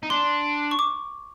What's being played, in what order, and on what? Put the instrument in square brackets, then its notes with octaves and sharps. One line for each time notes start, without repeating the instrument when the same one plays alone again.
[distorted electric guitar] D#4
[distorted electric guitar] D4 [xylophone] C6
[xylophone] C#6
D6